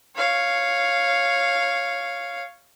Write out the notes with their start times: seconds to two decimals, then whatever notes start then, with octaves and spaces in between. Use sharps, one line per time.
0.16 C#5 F5